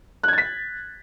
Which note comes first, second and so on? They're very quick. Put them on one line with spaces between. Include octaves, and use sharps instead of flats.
F#6 G#6 A6 B6